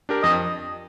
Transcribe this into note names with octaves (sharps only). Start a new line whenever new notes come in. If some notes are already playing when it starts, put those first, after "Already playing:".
D4 G4 A#4
F2 D#5